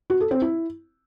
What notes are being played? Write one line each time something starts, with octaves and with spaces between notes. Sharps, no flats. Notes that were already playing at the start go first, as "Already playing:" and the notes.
F#4
A4
C4
E4